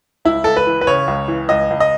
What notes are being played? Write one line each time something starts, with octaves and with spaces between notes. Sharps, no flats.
C#2 E4
C#2 A4
B4
E3
B4
C#3 C#5
C#2
E3
C#2 D#5
C#2
D#5